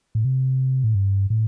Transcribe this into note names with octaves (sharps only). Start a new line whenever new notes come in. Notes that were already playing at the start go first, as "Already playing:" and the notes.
A2
C3
A2
G2
A2